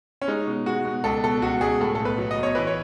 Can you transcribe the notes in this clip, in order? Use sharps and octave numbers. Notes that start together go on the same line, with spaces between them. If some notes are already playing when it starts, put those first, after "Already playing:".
C#4
G#3 D#4
B2
G#3 F#4
B2
C#2 A4
B2 A4
C#2 F#4
C#2 G#4
A2 A4
B1 A4
B4
F#3
D#5
B1 C#5
E3 B4
C#5